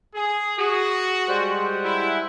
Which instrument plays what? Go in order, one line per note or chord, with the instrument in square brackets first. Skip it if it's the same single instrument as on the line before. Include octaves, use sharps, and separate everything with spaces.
[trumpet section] G#4
[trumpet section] F#4 [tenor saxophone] G#4
[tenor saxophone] G3 [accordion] G#3 C5 F#5
[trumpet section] E4